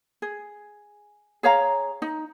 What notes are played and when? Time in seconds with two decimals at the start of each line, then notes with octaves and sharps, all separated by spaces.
0.22 G#4
1.43 G#4 C#5 F5 A#5
2.02 D#4